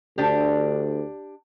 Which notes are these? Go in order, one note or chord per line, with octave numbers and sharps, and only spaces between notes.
D2 D4 G4